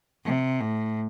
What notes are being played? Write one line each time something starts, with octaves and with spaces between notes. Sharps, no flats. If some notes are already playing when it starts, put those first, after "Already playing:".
C3
A2